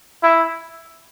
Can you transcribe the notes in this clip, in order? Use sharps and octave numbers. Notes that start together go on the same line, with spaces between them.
E4